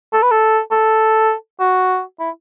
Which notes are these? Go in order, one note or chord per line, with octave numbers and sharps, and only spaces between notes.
A4
B4
A4
A4
F#4
E4